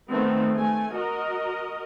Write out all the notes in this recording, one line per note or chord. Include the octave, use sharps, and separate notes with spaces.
D#3 A3 B3 C4
A3 G#5
F#4 A#4 D#5